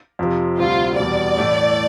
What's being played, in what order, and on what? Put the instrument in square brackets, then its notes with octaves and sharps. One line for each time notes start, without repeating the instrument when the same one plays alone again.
[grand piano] F2 C3 F3
[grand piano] D2 C3 G3 C4 [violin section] F4
[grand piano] E2 B2 G3 [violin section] D5
[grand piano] A2 E3 A3